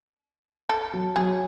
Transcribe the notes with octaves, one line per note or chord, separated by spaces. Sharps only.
A4
F#3
F#3 G#4